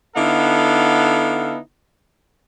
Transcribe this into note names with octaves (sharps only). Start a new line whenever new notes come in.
D3 B3 D#4 E4 A4 F5